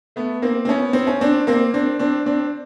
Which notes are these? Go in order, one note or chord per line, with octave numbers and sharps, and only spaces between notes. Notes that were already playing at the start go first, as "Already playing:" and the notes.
A3 B3
A#3 C4
C4
B3 C#4
C4
C#4
C4 D4
A#3 C4
C4 D4
C4 D4
C4 D4